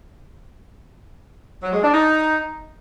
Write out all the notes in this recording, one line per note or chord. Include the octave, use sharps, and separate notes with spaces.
F#3
G#3
D4
D#4